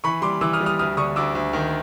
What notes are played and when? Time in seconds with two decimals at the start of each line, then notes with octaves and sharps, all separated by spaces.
0.04 E3 B5 C#6
0.22 G3 C6 D6
0.41 E3 D6 E6
0.53 D#6 F6
0.61 G3
0.66 D#6 F6
0.79 D2 D#6 F6
0.97 D3 C#6 D#6
1.16 D2 D6 E6
1.35 D2
1.53 D#3